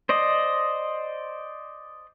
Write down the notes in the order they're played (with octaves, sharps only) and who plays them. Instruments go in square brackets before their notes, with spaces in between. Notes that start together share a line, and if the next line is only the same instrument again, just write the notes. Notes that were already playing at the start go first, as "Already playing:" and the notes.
[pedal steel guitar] C5 D5 D#5